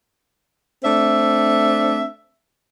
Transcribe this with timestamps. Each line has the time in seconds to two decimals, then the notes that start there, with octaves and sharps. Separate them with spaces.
0.84 A3 C4 D4 E5